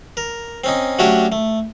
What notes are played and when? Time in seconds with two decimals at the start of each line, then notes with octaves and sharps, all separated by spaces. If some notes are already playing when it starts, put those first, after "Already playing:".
0.17 A#4
0.64 C4 C#4 D#4
0.99 F#3 A3 C#4 D4 F#4 G4
1.32 A3